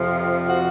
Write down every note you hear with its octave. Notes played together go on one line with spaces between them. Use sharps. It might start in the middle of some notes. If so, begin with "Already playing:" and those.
Already playing: F2 C3 F3
F#4